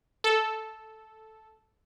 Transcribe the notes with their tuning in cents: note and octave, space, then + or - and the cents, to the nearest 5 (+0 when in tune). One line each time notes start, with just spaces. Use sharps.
A4 -5